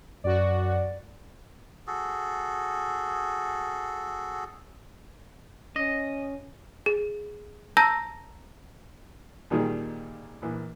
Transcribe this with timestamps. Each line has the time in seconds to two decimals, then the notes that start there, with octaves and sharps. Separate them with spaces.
0.24 F#2 F#4 D5
1.87 F#4 G#4 A4
5.76 C#4 D#5
6.86 G#4
7.77 A5 A#5 E6 G6 A#6
9.50 D#2 A#2 D#3 G3 G#4
10.42 A#1 E3